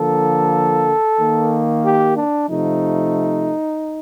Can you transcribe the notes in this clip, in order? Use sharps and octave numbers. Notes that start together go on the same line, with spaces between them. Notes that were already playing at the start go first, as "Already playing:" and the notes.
Already playing: D3 F3 A#3 A4
D#3 A#3
G4
D4
C3 F3 A3 D#4